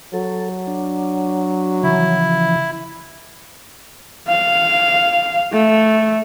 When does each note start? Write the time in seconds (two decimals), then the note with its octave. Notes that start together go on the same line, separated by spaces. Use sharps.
0.14 F#3 A4
0.67 D4
1.83 C#3 E3 F3 E4
4.28 F5
5.53 A3